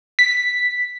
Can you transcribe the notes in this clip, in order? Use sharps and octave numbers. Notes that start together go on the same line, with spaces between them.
B6